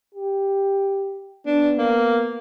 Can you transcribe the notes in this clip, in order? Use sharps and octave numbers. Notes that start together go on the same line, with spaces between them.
G4
B3 D4
A#3